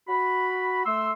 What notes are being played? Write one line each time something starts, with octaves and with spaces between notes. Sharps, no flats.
F#4 B5
A3 C6 E6